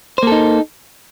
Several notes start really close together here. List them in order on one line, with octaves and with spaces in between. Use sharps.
C5 A#3 A4 D#4